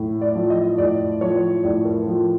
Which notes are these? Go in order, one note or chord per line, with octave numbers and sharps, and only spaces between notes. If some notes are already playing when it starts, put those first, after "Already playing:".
Already playing: A2
D5
F3
D#5
A2 D5
F3 C#5
A2 D5
A#4
F3